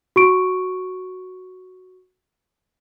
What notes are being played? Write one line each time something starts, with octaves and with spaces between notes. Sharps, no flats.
F#4 C#6 D7